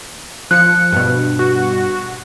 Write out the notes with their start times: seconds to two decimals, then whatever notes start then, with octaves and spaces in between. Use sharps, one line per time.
0.51 F3 F#6 C#7
0.93 G2 B2
1.39 F#4